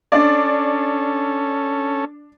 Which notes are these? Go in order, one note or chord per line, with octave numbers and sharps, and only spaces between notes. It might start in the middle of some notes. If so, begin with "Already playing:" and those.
C#4 D4 A4 D5